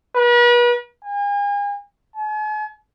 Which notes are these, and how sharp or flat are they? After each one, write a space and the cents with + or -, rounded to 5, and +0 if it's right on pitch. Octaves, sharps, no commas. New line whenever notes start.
B4 -40
G#5 -40
G#5 +45